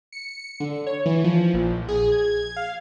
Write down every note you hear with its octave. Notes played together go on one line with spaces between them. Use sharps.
C#7
D3
C#5
E3
F3
A#1
G#4
G#6
F5